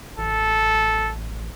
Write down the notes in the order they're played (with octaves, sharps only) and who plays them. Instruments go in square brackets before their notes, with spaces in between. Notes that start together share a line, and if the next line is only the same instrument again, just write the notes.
[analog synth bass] A1 [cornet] A4